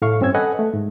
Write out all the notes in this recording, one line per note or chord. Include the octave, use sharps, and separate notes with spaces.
A2 A3 F5 C#6
G2 C4 C#4 E6 G#6
A4 B4 D#5 F#5 G#5
A3
G#2